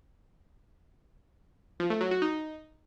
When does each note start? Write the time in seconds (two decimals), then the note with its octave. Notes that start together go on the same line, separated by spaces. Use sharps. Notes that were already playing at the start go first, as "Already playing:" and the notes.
1.80 F3
1.90 A3
2.01 F#3
2.11 F#4
2.22 D#4